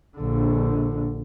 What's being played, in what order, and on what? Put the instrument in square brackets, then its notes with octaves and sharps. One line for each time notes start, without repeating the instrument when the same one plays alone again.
[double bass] A#1 D3